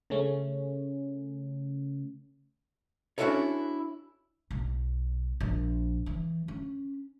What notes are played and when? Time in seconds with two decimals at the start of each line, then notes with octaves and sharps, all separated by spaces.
0.10 C#3 A3 C#4
3.18 C#4 D4 E4 F#4 A4 C#5
4.51 B1
5.40 A#1
6.06 E3
6.48 C#4